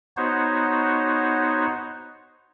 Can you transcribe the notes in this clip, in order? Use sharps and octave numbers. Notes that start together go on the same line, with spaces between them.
B3 D#4 F#4 C5 C#5